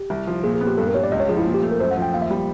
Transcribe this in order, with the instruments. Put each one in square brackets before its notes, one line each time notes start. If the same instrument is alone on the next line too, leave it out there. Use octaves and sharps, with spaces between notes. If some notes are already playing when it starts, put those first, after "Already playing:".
Already playing: [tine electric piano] G4
[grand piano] C2
F3
[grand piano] A#2 [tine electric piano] G#4
[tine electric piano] G#4
[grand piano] B3
[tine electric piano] G4
[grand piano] G2 [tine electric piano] A4
[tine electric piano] A#4
[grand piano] G3 [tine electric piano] C#5
[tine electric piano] D5
[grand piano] C#2 [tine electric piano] D#5
[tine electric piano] C#5
[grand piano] F3 [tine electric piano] G#4
[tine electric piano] E4
[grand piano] A#2
[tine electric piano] G4
[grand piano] A3
[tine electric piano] A#4
[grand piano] F#2 [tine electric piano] C5
[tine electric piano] F#5
[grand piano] F3
[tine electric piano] G5
[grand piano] D#2 [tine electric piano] F5
[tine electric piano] E5
[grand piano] G3